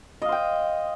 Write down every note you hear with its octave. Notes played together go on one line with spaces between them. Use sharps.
C5 D#5 F5 G5